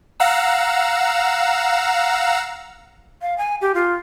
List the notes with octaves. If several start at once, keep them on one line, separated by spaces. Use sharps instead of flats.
F5 F#5 A#5 E6
F5
G#5
G4
F4